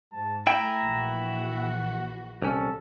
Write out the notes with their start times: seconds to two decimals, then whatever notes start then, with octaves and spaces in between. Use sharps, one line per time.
0.13 G#2 A5
0.47 A3 E4 G5 G#5 A#5
0.81 A#1 E3 F#4
1.37 F#5
2.42 C2 C#4 A4